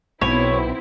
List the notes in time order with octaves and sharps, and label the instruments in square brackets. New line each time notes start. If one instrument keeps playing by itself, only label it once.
[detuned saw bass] B1 [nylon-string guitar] B2 [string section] B3 C4 E4 [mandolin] C#5